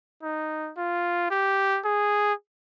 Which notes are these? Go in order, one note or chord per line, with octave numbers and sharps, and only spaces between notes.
D#4
F4
G4
G#4